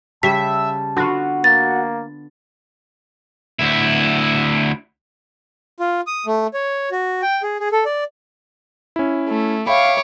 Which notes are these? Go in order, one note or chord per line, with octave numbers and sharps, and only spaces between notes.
C#3 G3 E5 A5 B6
D3 B3 F4 F#4
A#3 A6
D2 E4
F4
D#6
A3
C#5
F#4
G5
G#4
G#4
A4
D5
C#4 E4
A3
C#5 E5 F5 G5 B5 D6